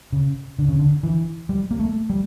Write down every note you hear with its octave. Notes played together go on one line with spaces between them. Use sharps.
C#3
D3
C#3
D3
E3
G3
A#3
A3
G3